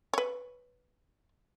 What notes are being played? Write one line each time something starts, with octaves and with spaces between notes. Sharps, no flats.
B4 C#5